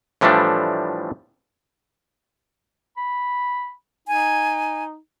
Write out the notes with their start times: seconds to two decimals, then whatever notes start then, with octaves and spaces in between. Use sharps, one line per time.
0.21 A2 E3 F3 G3 A3 D4
2.97 B5
4.08 D#4 G#5